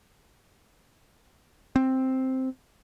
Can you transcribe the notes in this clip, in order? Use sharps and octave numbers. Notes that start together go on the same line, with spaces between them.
C4